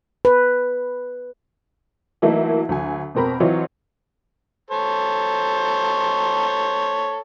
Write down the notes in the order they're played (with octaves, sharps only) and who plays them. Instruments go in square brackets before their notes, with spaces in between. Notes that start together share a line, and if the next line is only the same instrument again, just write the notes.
[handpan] B4
[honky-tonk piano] E3 F#3 A3 A#3 D#4 E4
D2 F#3 G#5
F2 B2 C4 A#4 B5
E3 F#3 C4 F4 C#5 D#5
[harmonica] A4 C5 C#5